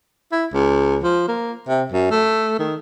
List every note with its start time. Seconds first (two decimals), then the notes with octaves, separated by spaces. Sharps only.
0.32 E4
0.53 C#2
1.03 F3
1.28 A#3
1.68 C3
1.92 F#2
2.11 A3
2.59 D#3